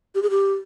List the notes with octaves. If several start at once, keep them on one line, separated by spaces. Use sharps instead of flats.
G4
G#4
G4